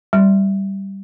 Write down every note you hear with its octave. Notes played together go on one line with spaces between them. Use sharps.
G3